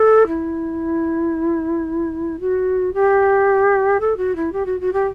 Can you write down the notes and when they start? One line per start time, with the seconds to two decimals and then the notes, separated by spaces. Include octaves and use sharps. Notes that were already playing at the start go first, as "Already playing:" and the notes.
Already playing: A4
0.27 E4
2.40 F#4
2.94 G4
4.00 A4
4.17 F#4
4.36 E4
4.53 G4
4.66 F#4
4.80 F#4
4.93 G4